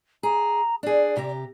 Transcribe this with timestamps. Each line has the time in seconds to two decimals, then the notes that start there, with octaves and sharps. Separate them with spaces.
0.23 G#4 A#5
0.83 D4 G#4 D5
1.17 C3 G4 A#5